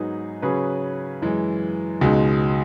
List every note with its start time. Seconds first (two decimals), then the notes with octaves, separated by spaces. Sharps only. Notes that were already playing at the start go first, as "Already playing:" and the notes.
Already playing: G#2 F#3 B3 D#4 G#4
0.42 C#3 F#3 C#4 G#4 B4
1.22 F#2 E3 G#3
2.01 C#2 B2 G#3 D#4